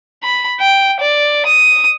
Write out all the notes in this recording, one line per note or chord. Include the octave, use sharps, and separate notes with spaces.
B5
G5
D5
D#6